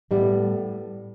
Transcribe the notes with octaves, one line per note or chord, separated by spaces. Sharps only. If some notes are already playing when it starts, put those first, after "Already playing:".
A2 G3 B3 E4